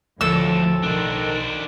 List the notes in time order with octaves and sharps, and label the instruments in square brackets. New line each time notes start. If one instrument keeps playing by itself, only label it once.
[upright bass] D1 D3 [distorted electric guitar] D2 [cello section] A2 F3 [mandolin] A4 E6
[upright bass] B1 [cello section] D#3 [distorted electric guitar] D4 C5